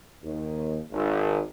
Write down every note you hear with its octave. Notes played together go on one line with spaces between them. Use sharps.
D#2
G#1